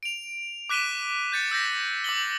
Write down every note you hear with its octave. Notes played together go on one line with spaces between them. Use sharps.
D7 F7
D6 F#6 B6 D#7 E7 G7
G6 A6 C#7
E6 G6 A#6 B6
D6 E6 F#7 G7